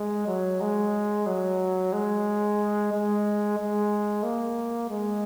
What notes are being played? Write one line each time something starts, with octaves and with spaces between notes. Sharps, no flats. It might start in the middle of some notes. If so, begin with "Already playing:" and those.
Already playing: G#3
F#3
G#3
F#3
G#3
G#3
G#3
A#3
G#3